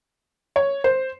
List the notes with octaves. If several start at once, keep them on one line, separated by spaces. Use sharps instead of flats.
C#5
C5